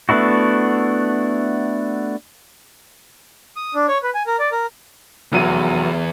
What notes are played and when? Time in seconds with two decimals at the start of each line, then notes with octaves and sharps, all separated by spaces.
0.09 A3 B3 D4 E4 F#4
3.56 D#6
3.75 D4
3.88 C#5
4.03 B4
4.15 G#5
4.27 A#4
4.39 D5
4.52 A#4
5.32 F1 E2 F#3 D#7